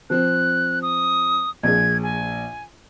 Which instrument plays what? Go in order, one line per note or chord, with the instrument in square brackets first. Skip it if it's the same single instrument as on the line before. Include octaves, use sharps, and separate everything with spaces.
[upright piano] F3 C4 [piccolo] F#6
[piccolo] D#6
[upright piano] A#1 G#4 [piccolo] G#6
[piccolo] G#5